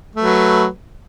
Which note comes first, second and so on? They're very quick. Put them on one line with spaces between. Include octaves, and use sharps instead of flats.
A3 B4 F#3